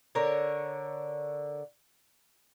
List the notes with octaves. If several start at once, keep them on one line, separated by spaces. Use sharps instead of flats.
D3 A#4 C#5